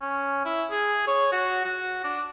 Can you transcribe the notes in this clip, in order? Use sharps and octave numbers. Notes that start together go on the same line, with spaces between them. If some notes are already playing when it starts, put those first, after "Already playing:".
C#4
E4
G#4
C#5
F#4
F#4
D4